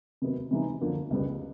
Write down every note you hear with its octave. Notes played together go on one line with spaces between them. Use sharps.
C3 D#3 F#3 B3
C3 E3 G3 B3 D#4
F#2 D3 F3 A#3
C#2 B2 G3 B3